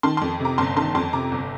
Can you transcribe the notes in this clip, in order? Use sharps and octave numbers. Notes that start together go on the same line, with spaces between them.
D#3 A5 C6
F2 A5 C6
C3 A#5 D6
G1 A5 C6
D#3 A5 C6
F2 A5 C6
C3 A#5 D6
G1